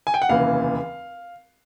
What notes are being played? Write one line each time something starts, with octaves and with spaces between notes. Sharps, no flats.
G#5
G5
F#5
F1 D#2 C#3 E3 F5